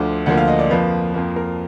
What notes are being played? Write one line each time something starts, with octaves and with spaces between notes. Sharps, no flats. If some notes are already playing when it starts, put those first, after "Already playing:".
Already playing: D2 D3 F3 D6
D2 D3 F3 A#3 F#5
F5
D#5
D5
F2 F3 A#3 B4
F2 F3 A#3
A#4